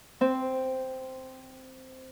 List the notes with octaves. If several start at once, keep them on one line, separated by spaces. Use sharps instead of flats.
C4